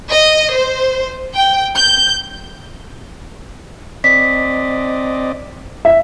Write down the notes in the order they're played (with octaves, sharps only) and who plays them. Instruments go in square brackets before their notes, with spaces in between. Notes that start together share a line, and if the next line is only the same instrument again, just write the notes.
[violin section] D#5
C5
G5
G6
[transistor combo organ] C4 D5 D#5 [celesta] B6
[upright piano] E5